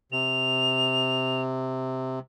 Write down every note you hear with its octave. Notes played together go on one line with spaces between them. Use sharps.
C3 F7